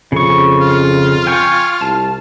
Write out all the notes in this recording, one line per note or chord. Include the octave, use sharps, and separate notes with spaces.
F2 C#3 C#6
F4
G5 G#5 C#6
C2 A5